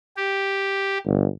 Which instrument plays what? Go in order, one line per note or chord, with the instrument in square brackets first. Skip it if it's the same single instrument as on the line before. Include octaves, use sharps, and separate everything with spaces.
[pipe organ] G4
[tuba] G1